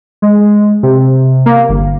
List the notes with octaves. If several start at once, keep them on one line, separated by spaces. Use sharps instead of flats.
G#3
C3
A#3
G1